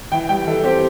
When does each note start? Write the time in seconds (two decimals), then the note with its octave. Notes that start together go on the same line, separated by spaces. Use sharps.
0.12 E3 G5
0.29 G3 G5
0.47 E3 A4
0.64 C4 G4